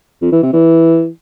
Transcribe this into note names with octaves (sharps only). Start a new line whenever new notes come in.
F2
E3
C3
E3